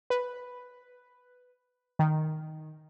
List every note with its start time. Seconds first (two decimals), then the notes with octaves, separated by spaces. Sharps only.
0.10 B4
1.99 D#3